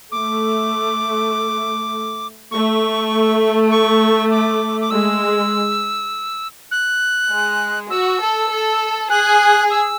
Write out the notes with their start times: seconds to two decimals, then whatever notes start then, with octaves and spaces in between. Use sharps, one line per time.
0.12 A3 D6
2.51 A3 C#6
3.71 C#6
4.31 D6
4.81 D6
4.91 G#3 E6
6.71 F#6
7.30 G#3
7.90 F#4 E6
8.20 A4
8.50 A4
9.10 G#4 F#6
9.71 E6